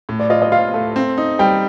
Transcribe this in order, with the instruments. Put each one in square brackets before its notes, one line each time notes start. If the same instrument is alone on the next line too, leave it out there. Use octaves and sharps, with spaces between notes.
[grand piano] A2
[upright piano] D5
[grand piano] F4 [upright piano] D#5
[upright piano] D#5
[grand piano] F4 [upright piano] F5
[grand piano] A3
C4
D#4
[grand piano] G3 [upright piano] G5